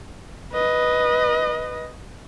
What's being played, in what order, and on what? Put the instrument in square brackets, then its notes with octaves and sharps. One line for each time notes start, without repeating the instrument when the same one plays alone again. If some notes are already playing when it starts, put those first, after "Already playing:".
[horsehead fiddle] B4 D#5